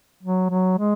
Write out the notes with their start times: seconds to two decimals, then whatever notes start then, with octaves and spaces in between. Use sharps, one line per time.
0.23 F#3
0.50 F#3
0.77 G#3